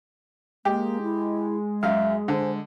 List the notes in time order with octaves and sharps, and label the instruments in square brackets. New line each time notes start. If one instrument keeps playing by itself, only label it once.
[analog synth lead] G#3 [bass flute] A#3 [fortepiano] G4
[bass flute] E4
[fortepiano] F#2 F5 [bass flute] E5
[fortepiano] D3 [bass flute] C5